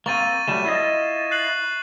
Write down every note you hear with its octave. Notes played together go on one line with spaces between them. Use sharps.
A#3 C4 C#6 A6 D#7
F#3 G3 A3 E7
E4 F4 D#5
F#6 C7 F#7